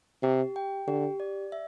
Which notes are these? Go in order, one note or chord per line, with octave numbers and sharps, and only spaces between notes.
C3 G4
G5
D3 G4
D5
E5